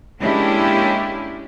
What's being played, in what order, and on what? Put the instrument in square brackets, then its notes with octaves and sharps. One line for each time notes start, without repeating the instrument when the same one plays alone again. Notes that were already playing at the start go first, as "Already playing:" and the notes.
[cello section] G#3 A#3 C#4 D4 E4 G4